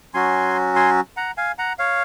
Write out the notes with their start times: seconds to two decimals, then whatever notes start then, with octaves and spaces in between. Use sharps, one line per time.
0.14 F#3 C#4 F#4 G#5 C6
0.76 G#5 C6
1.17 F#5 A#5
1.37 F5 G#5
1.58 F#5 A#5
1.79 C#5 F5